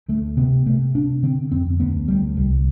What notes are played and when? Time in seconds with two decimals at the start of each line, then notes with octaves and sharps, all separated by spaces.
0.08 D2 A3
0.37 C3 B3
0.66 C3 A3
0.95 C3 D4
1.23 D3 C4
1.51 F2 C4
1.80 D2 B3
2.08 D2 G3
2.36 C2 G3